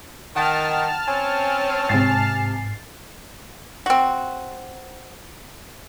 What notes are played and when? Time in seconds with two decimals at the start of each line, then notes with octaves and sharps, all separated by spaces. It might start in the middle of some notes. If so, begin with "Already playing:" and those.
0.36 D#3 F#5 G5 A5 F6
1.08 C4 C#4 G#5
1.89 G#2 C3 G#5 A6 C7
3.86 C4 F#4